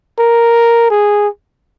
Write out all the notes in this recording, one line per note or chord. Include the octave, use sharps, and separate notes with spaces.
A#4
G#4